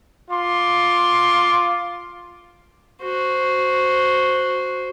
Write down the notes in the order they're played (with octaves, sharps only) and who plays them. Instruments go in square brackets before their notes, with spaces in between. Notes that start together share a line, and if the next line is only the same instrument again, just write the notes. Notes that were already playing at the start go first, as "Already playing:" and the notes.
[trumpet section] F4 C6 D6
[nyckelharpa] F#4 C5